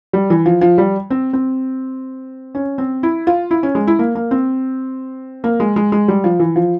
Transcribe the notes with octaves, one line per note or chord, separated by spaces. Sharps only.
G3
E3
F3
F3
G3
C4
C4
C#4
C4
E4
F4
E4
C#4
G#3
E4
A#3
A#3
C4
A#3
G#3
G#3
G#3
G3
F3
E3
F3